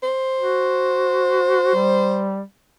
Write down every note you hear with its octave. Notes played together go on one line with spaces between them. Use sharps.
C5
F#4
G3